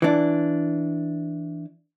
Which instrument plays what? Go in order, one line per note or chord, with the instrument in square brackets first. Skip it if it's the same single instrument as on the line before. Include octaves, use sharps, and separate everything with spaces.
[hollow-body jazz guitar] E3 D4